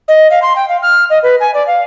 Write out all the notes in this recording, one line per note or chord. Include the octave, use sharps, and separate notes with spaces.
D#5
F5
C6
G5
F5
F6
D#5
B4
G#5
D5
F5